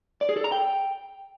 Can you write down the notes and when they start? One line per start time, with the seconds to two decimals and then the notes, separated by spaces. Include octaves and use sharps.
0.21 D5
0.29 G#4
0.37 A4
0.44 A#5
0.52 G5